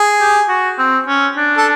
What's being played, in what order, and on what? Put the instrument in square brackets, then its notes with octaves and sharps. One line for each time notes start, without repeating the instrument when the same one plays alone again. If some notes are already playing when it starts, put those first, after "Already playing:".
Already playing: [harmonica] G#4
[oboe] G4
F#4
C4
C#4
D4
[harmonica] A4